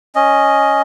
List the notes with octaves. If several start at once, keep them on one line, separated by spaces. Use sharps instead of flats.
C#4 D#5